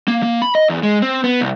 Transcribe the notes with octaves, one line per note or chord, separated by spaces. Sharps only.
A#3
A#3
B5
D#5
E2
G#3
C4
B3
C2